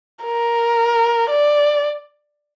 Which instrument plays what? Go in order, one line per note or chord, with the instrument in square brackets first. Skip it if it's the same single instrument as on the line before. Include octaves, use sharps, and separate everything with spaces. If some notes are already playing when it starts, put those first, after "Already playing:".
[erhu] A#4
D5